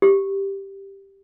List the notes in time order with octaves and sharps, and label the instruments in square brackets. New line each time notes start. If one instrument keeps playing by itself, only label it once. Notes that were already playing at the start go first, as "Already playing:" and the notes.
[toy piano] G4